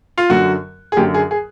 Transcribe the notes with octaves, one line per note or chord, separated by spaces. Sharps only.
F4
F#2 D3 F#3 F#4
G#4
F#2 D3 F#3 G4
G#4
G#4